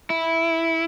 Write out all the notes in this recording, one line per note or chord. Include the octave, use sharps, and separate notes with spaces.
E4